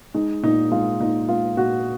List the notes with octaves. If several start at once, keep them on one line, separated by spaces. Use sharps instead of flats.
G#3 D#4
A#2 D#4
G#3 F4
A#2 D#4
G#3 F4
A#2 F#4